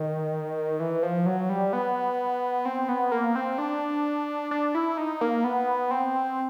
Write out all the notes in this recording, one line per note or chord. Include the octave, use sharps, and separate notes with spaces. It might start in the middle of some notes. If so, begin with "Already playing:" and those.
Already playing: D#3
E3
F3
F#3
G3
B3
C4
B3
A#3
C4
D4
D4
E4
D#4
A#3
B3
C4